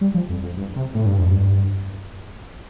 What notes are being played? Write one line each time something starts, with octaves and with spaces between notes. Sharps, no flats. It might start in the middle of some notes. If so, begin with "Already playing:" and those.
G3
F3
F2
F2
G2
C3
A2
G2
F2
G2